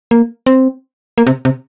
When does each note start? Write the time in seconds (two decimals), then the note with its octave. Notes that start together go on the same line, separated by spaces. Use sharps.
0.11 A#3
0.46 C4
1.18 A#3
1.27 C3
1.45 C3